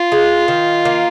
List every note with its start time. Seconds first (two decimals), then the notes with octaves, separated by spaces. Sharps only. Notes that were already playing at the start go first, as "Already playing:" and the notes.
Already playing: F4
0.12 G#3
0.48 D#3
0.85 A#3